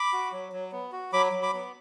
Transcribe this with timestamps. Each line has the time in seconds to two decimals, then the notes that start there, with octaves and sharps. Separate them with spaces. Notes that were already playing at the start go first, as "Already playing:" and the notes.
Already playing: B5 D6
0.13 F#4
0.32 F#3
0.52 F#3
0.72 B3
0.92 F#4
1.13 F#3 B5 D6
1.33 F#3
1.42 B5 D6
1.53 B3